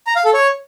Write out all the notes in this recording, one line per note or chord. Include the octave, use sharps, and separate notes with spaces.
A#5
F5
A4
C#5